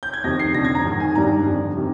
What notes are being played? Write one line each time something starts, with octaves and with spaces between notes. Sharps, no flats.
G6
G#6
F2 C3 D#3 A#6
C7
F2 D3 A#6
G#6
A#5
G#2 D#3 A#5
G#5
G2 D#3 A#5
F2 D3
C3 D#3